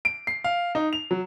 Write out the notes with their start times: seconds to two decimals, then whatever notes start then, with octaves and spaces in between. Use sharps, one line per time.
0.05 D7
0.27 C7
0.44 F5
0.75 D#4
0.93 F7
1.11 F#3